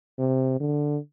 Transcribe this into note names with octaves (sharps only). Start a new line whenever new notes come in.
C3
D3